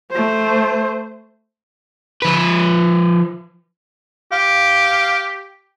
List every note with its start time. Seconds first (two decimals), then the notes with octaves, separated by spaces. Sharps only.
0.11 A3 C5
2.22 F3 B4
4.32 G4 F5